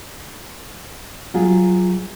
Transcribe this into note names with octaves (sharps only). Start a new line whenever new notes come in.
F#3 F4 G#4